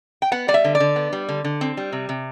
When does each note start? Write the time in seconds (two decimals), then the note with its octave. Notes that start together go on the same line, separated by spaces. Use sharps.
0.22 G5
0.32 B3 F#5
0.48 G3 D5
0.54 E5
0.64 D3
0.75 D5
0.80 D3
0.96 B3
1.13 G3
1.29 D3
1.44 D3
1.61 C4
1.77 G3
1.92 C3
2.09 C3